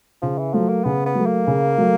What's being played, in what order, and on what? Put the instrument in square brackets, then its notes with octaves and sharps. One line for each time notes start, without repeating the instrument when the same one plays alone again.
[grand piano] C#3 [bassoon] F3
[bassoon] E3
[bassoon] F3 [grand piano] F#3 A3
[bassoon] A#3
[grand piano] C#3 [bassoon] B3
[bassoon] B3
[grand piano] F#3 A3
[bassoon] A#3
[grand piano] C#3
F#3 A3